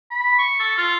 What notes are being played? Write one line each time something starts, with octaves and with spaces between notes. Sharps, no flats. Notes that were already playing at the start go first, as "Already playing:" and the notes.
B5
C#6
A4
F4